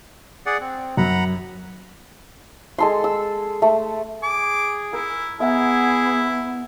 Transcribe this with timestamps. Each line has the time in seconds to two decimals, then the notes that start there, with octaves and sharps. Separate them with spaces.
0.46 G#4 D5 F#5
0.61 C4
0.97 F#2 F#5 A#5 B5
2.78 G#3 A4 C6
3.04 E6
3.62 A3
4.23 G#4 D6
4.93 E4 A#4
5.40 B3 E4 G#4 E5 F#5 A#5